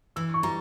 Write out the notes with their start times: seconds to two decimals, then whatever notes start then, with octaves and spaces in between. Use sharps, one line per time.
0.16 E3 E6
0.34 C#6
0.43 G3 A#5